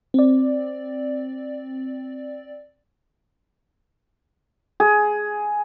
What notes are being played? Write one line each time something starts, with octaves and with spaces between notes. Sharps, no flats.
C4 D5
G#4